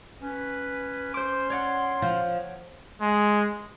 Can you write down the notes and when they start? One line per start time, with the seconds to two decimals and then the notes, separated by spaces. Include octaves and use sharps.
0.21 C#4 B4
1.14 C5 C6 D6
1.50 C#5 D5 F#5
2.02 F3
3.01 G#3